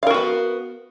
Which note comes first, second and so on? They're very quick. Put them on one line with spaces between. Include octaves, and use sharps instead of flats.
F5 A#4 F#4 B3